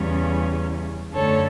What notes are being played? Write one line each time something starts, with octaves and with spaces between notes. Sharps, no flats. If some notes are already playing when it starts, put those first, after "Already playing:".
Already playing: E2 C#3 G3 C#4
F#2 D3 A3 A4 C#5